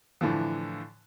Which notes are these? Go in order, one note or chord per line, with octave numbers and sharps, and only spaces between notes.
A2 D3 E3 F3